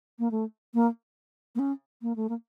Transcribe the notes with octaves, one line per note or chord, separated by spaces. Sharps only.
A#3
A3
A#3
A#3
C#4
A#3
A3
A#3